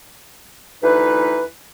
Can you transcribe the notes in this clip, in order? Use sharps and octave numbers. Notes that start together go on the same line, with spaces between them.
D2 E3 D#4 B4